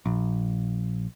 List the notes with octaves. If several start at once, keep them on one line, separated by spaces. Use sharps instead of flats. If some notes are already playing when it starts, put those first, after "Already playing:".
A#1